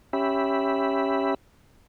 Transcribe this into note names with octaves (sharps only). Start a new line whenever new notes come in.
C#4 G4 E5 B5